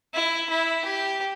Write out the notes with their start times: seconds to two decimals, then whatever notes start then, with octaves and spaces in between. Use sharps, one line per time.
0.14 E4
0.49 E4
0.85 G4